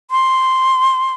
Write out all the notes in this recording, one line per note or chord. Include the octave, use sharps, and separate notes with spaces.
C6